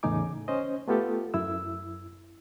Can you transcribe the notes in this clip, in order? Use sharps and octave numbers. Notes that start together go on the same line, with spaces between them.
E2 A2 C#3 D#4 G#5 D6
C#4 C5 D#5
A3 B3 F4 G4 A4
F#2 E4 E6